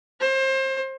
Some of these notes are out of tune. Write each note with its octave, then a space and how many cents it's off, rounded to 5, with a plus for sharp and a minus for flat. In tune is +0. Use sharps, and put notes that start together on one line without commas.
C5 +30